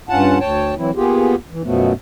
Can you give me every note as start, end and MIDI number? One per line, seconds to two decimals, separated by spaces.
0.09 0.39 43
0.09 0.39 61
0.09 0.39 65
0.09 0.39 78
0.09 0.39 81
0.40 0.75 38
0.40 0.75 73
0.40 0.75 79
0.40 0.75 81
0.77 0.91 52
0.77 0.91 54
0.77 0.91 60
0.77 0.91 64
0.96 1.35 58
0.96 1.35 59
0.96 1.35 65
0.96 1.35 67
0.96 1.35 68
1.51 1.62 52
1.64 1.93 42
1.64 1.93 47
1.64 1.93 53
1.64 1.93 54
1.64 1.93 57
1.64 1.93 59